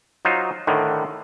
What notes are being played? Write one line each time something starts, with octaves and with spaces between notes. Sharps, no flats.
F#3 D#4 F4 C5
A2 D3 D#3